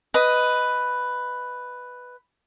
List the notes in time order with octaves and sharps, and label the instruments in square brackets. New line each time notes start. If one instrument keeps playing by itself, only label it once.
[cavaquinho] B4 D#5